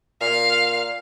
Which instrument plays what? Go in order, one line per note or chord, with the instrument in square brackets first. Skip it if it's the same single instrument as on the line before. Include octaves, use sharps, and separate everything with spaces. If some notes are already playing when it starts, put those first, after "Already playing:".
[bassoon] A#2 [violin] F5